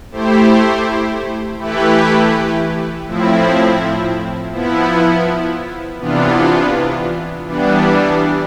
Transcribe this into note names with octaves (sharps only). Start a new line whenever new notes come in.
A3 E4 G4 C5
E3 A3 E4 G4 B4
A2 F3 C4 E4
F3 B3 E4
C3 E3 B3 D4 F4
E3 G3 B3 D4